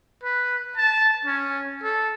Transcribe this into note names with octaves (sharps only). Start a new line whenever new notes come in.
B4
A5
C#4
A4